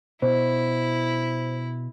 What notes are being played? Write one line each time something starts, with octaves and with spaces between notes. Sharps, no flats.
B2 E4 C5